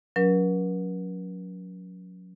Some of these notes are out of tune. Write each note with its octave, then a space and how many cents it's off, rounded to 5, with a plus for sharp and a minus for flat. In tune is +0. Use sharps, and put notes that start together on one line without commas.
F#3 -25 C#4 +30 A#4 +45